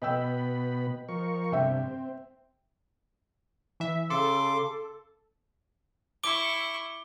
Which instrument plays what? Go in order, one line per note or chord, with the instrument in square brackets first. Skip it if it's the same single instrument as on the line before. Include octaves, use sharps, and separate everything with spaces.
[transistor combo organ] B2 B3 B5 [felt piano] D#5 G5 E6
[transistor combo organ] F3 A#4 C#6
[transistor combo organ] G2 C3 [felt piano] E5 G5
[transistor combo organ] C4
[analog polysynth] E3 E5
[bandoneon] C#3 C6 D6 [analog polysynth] A4
[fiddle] E4 C#6 [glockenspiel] D6 D7 G7